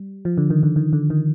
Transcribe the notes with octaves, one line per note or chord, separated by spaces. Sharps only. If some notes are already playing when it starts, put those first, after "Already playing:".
Already playing: G3
F3
D3
D#3
D3
D#3
D3
D#3